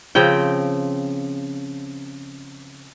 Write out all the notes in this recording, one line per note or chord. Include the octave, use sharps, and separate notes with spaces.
C#3 F3 C4 G5